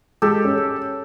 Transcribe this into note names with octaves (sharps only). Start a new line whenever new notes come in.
G#3 G4 A4
C#4